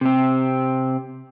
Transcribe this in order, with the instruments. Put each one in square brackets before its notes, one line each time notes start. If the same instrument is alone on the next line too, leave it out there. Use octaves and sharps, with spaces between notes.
[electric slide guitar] C3 C4